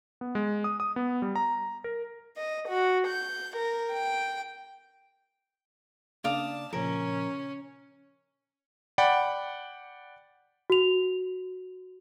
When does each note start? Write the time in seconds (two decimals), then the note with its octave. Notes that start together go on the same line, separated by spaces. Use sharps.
0.21 B3
0.35 G#3
0.64 D#6
0.80 D#6
0.96 B3
1.22 G3
1.36 A#5
1.84 A#4
2.37 D#5
2.68 F#4
3.07 G6
3.56 A#4
3.92 G5
6.24 C#3 A#3 D4 D5 F5 A5 D#6
6.73 A#2 C#3 F3 C#4 A#4
8.98 D5 F#5 G5 B5
10.70 F#4 F7